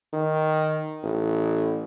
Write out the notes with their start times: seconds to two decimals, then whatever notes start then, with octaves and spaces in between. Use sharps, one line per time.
0.13 D#3
1.03 A1